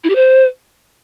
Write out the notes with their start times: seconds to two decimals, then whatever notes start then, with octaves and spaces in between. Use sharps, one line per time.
0.04 E4
0.10 G4
0.15 C5